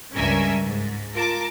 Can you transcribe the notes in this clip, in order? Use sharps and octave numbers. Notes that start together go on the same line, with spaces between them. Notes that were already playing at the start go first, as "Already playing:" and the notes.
C#2 G2 C#4 A#4 E5 G#5
G#2
F4 A#4 A5 D6